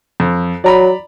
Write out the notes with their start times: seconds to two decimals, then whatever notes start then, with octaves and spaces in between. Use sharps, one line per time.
0.20 F2
0.64 F#3 D5 A#5 B5